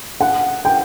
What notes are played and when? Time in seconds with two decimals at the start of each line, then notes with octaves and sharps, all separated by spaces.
0.21 F#5
0.65 G5